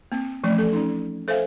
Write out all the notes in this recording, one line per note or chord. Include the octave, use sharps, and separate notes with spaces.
A#3 C4
E3 F3 A3 C#4 D5
A4
C#4 D#4
A4 C5 E5 F5 G#5